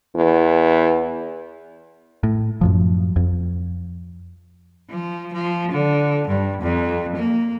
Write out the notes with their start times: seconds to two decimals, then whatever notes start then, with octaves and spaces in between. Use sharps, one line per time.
0.15 E2
2.23 A2
2.61 F#2 A2 F3
3.16 F2
4.90 F3
5.33 F3
5.71 D3
6.28 G2
6.61 F2
7.16 A#3